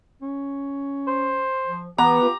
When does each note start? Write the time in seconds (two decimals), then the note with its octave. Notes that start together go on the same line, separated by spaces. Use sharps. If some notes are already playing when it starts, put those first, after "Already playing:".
0.22 C#4
1.08 C5
1.67 F3
1.98 E3 B3 G4 A#5
2.22 F4